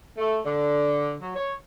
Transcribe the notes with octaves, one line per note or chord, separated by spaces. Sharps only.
A3
D3
F#3
C#5